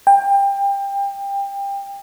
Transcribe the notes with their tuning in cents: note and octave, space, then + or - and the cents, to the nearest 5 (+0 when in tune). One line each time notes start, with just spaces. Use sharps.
G5 +25